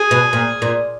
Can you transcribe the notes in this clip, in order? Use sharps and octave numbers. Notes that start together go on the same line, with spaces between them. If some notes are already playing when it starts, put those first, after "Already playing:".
Already playing: G#4
B2
A#2
A#2